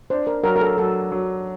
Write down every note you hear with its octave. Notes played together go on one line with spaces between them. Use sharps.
D4 C5
A#4
F#3 A#4
A#4
A4
F#3 A4
F#3